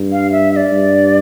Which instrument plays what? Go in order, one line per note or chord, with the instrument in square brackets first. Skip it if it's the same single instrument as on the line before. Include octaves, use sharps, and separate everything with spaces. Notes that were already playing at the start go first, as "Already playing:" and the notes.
Already playing: [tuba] G2
[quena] F5
E5
E5
D5
[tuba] G2